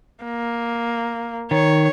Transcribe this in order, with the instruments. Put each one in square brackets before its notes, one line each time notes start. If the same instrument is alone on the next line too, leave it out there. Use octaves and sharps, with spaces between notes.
[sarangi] A#3
[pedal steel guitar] D#3 [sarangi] C#5